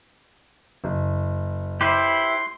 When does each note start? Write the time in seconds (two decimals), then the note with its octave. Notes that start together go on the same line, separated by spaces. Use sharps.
0.84 F#1
1.81 E4 G4 B4 C5 C6